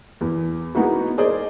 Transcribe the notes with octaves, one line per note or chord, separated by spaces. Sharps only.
E2
G#3 A#3 B3 D#4 E4 F#4
G#4 A#4 C5 D5 D#5